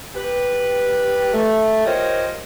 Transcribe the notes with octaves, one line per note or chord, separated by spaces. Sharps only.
G4 B4
A3
F4 G4 A#4 C5 C#5 D#5